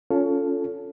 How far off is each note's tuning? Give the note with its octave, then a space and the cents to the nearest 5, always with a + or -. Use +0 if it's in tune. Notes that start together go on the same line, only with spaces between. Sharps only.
C#4 +20 F4 +0 A4 +0